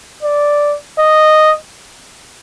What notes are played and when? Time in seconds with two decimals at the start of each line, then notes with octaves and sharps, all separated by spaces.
0.23 D5
0.99 D#5